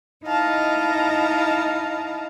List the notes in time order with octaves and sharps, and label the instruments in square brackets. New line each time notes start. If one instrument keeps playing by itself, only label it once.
[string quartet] D#4 E4 D#5 F5 A5 A#5